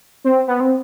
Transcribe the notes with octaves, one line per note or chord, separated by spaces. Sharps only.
C4
B3
C4